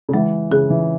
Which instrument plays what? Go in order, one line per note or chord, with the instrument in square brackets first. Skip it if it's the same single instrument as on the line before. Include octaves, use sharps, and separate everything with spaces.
[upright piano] C#3
[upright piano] E3 [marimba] G#3
[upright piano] C#3 [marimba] G#4
[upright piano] E3